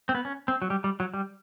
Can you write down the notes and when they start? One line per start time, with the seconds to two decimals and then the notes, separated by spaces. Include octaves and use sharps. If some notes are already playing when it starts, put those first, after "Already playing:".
0.09 C4
0.15 B3
0.25 C#4
0.48 C4
0.62 F#3
0.70 G3
0.84 G3
1.00 F#3
1.14 G3